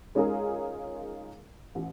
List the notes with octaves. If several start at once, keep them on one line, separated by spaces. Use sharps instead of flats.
G#3 C#4 D#4 F4 G#4 A#4
A1